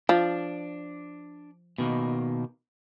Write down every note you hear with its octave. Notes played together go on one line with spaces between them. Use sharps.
F3 D4
B2 D#3 A#3